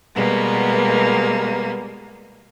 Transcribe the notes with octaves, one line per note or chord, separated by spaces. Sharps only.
B2 G3 G#3 A#3 B3